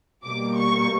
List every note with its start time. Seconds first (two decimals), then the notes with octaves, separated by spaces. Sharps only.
0.25 B2 G3 A#3 D6
0.57 C#6